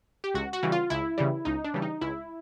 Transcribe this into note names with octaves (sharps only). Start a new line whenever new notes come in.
G4
C#2 F#4
F#4
C#3 E3 G3
F4
C#2 E4
C#3 E3 G3
C#2 D#4
D4
C#3 E3 G3
D#4
C#2 E4